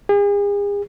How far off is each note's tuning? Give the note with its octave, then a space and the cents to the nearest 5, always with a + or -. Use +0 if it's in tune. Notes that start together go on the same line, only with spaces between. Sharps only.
G#4 -40